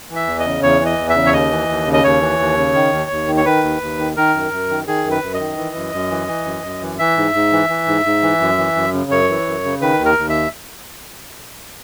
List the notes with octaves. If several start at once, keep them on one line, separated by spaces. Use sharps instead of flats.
E3
E5
E2
D#5
C#3
E2 C#5
E3
D#5
E2
E5
C#3
C#5
D#2 D#5
E3
D#2
C#3
D#5
D#2 C#5
E3
D#2
C#3
D#3
D#2
D#2
D#3
C#5
D#3 B4
D#2
D#2
D#3
D#3 A#4
F#2
F#2
D#3
D#3 G#4
F#2
B4
F#2
D#5
D#3
E3
F#2
F#2
E3
E3
F#2
F#2
E3
E3 E5
G#2
G#2
E3
E3
G#2
G#2
E3
F#2
E3
F#2
C#3
F#2 C#5
E3
F#2
C#3
D#3 B4
D#2
A#4
D#2
E5